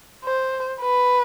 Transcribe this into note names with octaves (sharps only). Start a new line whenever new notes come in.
C5
B4